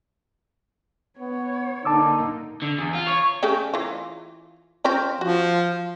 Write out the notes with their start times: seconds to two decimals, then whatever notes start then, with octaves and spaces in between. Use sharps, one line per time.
1.19 B3 C#5
1.85 D3 A#3 D#4 A5 D6 E6
2.62 D3
2.78 E2
2.94 F4
3.07 C#5
3.43 C#3 A3 G4
3.74 E3 F4
4.84 C4 C#4 F4
5.21 F3 F#4